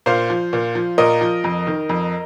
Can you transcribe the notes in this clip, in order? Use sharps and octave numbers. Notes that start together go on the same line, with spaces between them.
A#2 C5 F5
F3
A#2
F3
A#2 A#4 D#5
F3
F2
D#3
F2